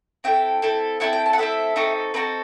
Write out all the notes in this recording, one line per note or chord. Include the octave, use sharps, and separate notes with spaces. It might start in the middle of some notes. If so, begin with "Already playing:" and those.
C4 E4 A4 G5
C4 E4 A4
C4 E4 A4 F#5
G5
A5
F#5
C4 E4 A4 E5
C4 D#4 F#4 A4
C4 D#4 F#4 A4 B4